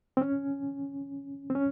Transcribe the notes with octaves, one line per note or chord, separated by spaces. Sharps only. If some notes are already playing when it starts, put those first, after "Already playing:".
C4
C#4
C4
C#4